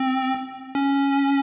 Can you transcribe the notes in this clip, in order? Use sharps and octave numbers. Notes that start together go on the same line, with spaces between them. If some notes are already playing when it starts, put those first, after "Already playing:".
Already playing: C4
C#4